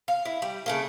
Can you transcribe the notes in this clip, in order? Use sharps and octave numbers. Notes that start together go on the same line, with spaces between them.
F5
E4
G3
C#3 A3 A#3